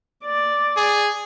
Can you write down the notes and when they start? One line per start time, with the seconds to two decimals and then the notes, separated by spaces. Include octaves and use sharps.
0.24 D5
0.77 G#4